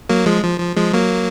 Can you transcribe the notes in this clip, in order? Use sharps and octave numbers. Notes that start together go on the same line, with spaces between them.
F#3 A#3
F3 G#3
F3
F3
F3 G#3
F#3 A#3